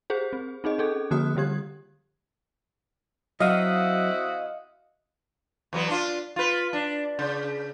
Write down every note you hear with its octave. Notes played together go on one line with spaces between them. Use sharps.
G4 G#4 C5
C4
C4 D#4 G#4 D#5
C#4 G#4 A4
D3 F3 A#3 F#4 D#6 F#6
D3 G3 G4 G#6
F#3 C4 E4 F#4 D#5 F5 D#6
E2 F#3 B3
D4 F4
F4 B4
D4
C#3